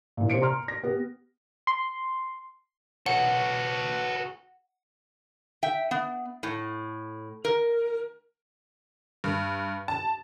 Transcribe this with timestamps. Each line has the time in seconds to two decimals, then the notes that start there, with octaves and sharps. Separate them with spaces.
0.17 A#2 E3
0.30 C3 C5 C#7 D7
0.41 A#5 C6 F6
0.68 A#6
0.84 B3 G4
1.67 C6
3.06 F#4 A4 B4 C#5 F#5
5.63 E5 G5
5.91 B3
6.43 A2
7.45 A#4
9.24 G2
9.88 A5